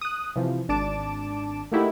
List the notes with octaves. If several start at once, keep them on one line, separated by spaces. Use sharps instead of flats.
D#6 F#6
C3 E3 F3
G#1 D4 A5 D6 D7 E7
A3 A#3 D#4 E4 F#4 G4